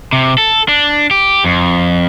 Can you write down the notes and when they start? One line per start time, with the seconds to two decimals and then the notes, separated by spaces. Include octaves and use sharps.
0.13 C3
0.38 A4
0.68 D4
1.11 G4
1.44 F2